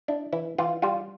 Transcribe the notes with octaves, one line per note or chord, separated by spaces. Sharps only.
D4 E4
E3 E4
E3 F4
G3 F4